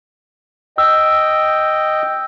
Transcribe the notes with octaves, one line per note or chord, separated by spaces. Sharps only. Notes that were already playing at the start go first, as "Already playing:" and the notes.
D#5 G5 E6